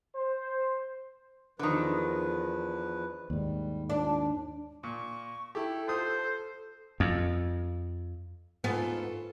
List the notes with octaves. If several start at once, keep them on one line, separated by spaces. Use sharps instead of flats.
C5
E2 D3 D#3 F3 B4
D#2 G#2 G3
A#2 D4
A#2 C#6
E4 G4 A4
F4 C5 D#6
F2
D2 G#2 B3 F4 A4 F5